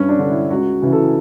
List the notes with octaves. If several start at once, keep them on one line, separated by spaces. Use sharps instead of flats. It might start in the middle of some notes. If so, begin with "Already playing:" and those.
Already playing: G2 C#4
D4
D3
E4
C#2 F#4
C#3 E3
A4